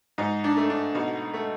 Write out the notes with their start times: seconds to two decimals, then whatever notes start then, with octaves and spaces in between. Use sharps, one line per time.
0.18 G#2 D#4
0.44 D4
0.57 A3
0.70 D4
0.95 B2 D#4
1.34 A3